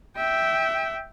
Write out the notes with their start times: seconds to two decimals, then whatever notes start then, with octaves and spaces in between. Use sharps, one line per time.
0.17 E5 G5